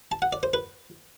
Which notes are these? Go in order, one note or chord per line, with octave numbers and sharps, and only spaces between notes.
A5
F#5
D5
C5
B4